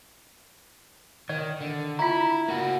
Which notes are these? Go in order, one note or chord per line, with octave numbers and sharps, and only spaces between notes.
D#3 D5
D3
E4 F4 A#5
A#3 F#4